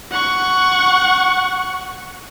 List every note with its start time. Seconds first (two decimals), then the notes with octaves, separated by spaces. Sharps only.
0.11 F#5 C#6